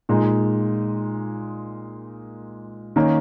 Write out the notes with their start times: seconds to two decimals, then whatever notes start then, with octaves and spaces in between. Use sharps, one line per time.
0.09 A#2 G#3 D#4
2.96 D#3 A#3 C#4